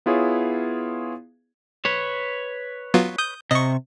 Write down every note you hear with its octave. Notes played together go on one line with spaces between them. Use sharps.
B3 E4 F4 G#4 C#5
B4 C#5
F#3 B3 F4
D#6 G6
C3 D#5 C#6